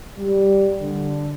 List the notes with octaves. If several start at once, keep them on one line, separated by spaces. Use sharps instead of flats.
G3
D3